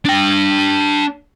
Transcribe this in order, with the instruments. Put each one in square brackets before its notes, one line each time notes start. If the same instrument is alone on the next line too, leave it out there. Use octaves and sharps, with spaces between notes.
[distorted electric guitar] D4 G5